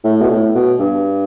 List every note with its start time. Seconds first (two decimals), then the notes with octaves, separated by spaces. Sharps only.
0.04 A2
0.21 B2
0.30 A2
0.55 B2
0.80 G2